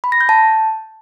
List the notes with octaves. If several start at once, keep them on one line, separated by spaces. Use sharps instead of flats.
B5
A#6
G6
A5